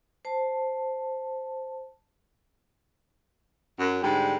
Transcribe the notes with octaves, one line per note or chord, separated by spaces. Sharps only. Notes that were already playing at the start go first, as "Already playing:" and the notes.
C5 A5
F#2
G#2 D3 G3